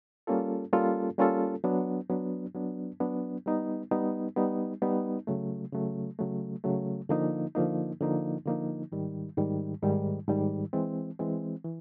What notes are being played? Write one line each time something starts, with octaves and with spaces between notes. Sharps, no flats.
G3 A#3 C#4 F4 A4
G3 A#3 C#4 F4 A4
G3 A#3 C#4 F4 A4
F#3 B3 D4
F#3 B3 D4
F#3 B3 D4
F#3 B3 D4
G3 B3 D#4
G3 B3 D#4
G3 B3 D#4
G3 B3 D#4
C#3 F#3 A3
C#3 F#3 A3
C#3 F#3 A3
C#3 F#3 A3
D3 F3 A#3 D#4
D3 F3 A#3 D#4
D3 F3 A#3 D#4
D3 F3 A#3 D#4
G#2 D#3 G3
G#2 D#3 G3
G#2 D#3 G3
G#2 D#3 G3
E3 G#3 C4
E3 G#3 C4
E3